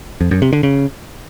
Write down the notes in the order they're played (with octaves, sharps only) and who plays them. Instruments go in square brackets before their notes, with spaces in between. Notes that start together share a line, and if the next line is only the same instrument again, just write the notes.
[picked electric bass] F2
F#2
C3
D3
C#3